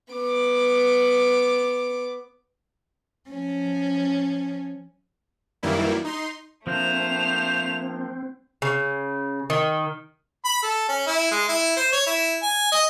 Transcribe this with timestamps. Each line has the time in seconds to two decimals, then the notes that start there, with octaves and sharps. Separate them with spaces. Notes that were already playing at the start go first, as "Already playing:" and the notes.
0.14 B3 D6
3.30 F3 C#4
5.63 F#2 D#3 E3 G3 A#3 E4
6.04 D#4 C6
6.67 F3 A3 A#3 C4 D4 C5 F7
8.62 C#3
9.50 D#3
10.45 B5
10.63 A4
10.88 C#4
11.07 E4
11.31 G#3
11.49 E4
11.77 C5
11.92 C#5
12.07 E4
12.42 G#5
12.72 D#5